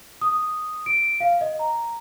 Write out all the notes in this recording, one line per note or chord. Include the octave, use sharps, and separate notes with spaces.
D#6
D7
F5
D#5
A#5